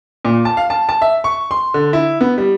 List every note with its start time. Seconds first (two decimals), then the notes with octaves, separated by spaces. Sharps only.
0.25 A#2
0.45 A5
0.57 F5
0.70 A5
0.89 A5
1.02 E5
1.24 C#6
1.51 C6
1.74 D3
1.93 E4
2.21 B3
2.38 G3